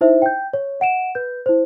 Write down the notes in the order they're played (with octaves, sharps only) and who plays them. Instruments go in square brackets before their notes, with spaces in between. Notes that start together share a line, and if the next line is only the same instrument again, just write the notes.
[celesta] D#4 E4 C5 E5
G5 G6
C#5
D#5 F#5 D7 E7
B4 G6
E4 C5